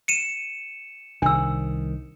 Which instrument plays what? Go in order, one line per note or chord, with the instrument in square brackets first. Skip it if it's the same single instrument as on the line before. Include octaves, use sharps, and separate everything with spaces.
[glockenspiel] C#7 D#7 E7
[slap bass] C2 D#3 [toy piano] D4 E6